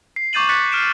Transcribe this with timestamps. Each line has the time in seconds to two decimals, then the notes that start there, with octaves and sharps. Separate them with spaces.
0.16 C7
0.33 C#6 D6 G6 A6 D#7 F#7
0.49 F#6 A6 B6 C#7
0.72 F6 C7 D7 E7